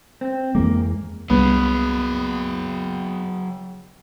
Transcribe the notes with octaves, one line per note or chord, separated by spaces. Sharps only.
C4
F2 E3 G#3 A#3
C2 F#3 G3 B3 D4 G#4 C#5